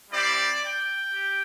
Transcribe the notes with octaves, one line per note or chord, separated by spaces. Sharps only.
G3 C4 E4 G4 D5
G5
G4